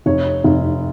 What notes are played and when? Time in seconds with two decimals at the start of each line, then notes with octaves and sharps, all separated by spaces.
0.06 F1 C#5
0.44 F1